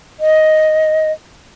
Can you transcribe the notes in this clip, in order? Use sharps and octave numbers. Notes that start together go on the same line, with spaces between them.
D#5